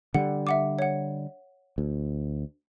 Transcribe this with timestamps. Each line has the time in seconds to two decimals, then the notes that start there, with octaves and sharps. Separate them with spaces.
0.14 D3 G3 F#5
0.47 E5 F#5 D6
0.79 C#5 F#5
1.78 D2